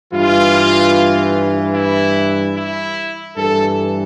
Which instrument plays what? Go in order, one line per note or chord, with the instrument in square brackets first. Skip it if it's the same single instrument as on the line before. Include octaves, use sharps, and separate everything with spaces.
[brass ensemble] G2 E3 F4
E4
E4
G2 E3 A4